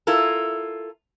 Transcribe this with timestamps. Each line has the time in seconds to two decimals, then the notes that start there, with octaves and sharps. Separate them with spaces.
0.07 E4 F4 A4 A#4